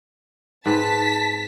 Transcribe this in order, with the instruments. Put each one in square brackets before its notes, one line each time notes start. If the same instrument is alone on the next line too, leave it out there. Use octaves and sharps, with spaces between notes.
[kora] G#2 C4 B4 [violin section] A5 B6